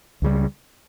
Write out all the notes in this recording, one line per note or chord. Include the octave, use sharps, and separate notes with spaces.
C#2 C#3 G3